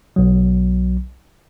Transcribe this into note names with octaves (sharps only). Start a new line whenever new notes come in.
B1 F#3